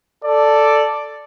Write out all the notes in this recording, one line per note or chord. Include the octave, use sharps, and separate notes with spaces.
A4 D5